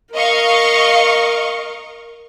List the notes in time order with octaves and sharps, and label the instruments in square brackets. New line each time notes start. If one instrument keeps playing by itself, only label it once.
[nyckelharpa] A#4 [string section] D#5 F5 C#6